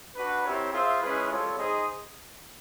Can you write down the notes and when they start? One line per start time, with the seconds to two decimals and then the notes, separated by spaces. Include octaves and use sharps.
0.15 D4 F#4 B4
0.43 C4 E4 G4 A#4 C#5
0.71 F4 G#4 C5 E5
1.01 G#3 C#4 E4 G#4 B4
1.28 G3 C4 F4 A4 C#5
1.56 D#4 G#4 C5 D#5